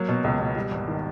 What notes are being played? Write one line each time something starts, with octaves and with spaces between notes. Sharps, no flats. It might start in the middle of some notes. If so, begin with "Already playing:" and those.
Already playing: F#3 A#3
B2
C#2
B2
G3
G#1
D#3